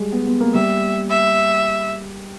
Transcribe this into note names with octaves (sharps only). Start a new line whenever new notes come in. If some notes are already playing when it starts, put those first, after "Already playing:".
Already playing: G3 G#3
B3
B3
A#3
G3 E5
E5